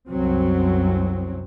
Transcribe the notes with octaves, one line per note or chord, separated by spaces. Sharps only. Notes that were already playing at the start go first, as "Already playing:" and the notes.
C2 F#2 F#3 C4